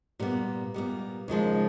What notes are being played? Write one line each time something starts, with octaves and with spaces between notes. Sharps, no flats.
A#2 G3 B3
A#2 G3 B3
D#2 C#3 F3 G#3